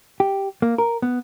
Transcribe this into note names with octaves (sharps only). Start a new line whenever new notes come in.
G4
A#3
A#4
B3